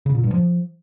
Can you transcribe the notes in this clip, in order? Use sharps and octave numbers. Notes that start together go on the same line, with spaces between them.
C#3
A#2
G2
F3